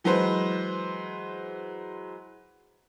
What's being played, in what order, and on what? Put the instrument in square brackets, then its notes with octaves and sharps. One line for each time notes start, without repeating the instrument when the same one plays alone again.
[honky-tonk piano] E3 F#3 G#3 B4 C5